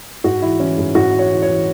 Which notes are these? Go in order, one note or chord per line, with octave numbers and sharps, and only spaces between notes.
G#2 F#4
E3 E4
E3 C#4
G#2
G#2 F#4
E3
C#5
E3
C#5
E3